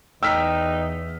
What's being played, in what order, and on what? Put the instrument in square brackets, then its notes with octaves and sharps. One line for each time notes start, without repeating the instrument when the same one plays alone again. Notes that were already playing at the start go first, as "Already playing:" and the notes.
[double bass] E2 [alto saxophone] D#4 [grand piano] G5 A#5 [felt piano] E6 F6 B6